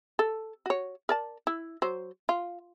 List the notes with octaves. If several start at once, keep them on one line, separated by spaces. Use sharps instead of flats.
A4
F#4 C#5
A#4 D5 A5
E4
F#3 C5
F4